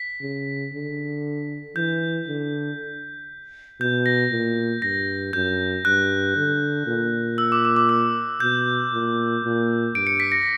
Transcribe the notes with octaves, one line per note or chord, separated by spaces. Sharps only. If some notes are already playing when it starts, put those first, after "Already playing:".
Already playing: B6
C#3
D3
E3 G6
D3
B2 G6
A#6
A#2
G2 A#6
F#2 G6
G2 F#6
D3
A#2
E6
D6
D6
D6
E6
B2 G6
A#2
A#2
G2 D7
C#7
B6
A#6 C#7